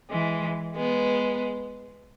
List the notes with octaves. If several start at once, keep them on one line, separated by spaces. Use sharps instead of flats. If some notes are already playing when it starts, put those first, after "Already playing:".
E3 G#3
G#3 B3